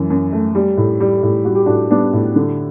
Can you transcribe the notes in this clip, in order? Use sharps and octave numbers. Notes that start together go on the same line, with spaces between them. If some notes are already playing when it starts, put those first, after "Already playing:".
Already playing: F#2 E3
F#2
A3
G3
A2
G3
A2
G3 F#4
G4
A2 D4 F#4
G3 B3 D4
A2
D3